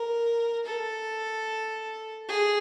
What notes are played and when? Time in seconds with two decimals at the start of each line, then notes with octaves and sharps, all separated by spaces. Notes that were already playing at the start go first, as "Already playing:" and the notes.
Already playing: A#4
0.66 A4
2.29 G#4